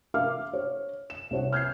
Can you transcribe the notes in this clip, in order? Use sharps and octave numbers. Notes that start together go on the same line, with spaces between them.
A#4 E5 F5 D6 F6
C#5
E7
C2 C#5 F#5
F6 G6 G#6 C7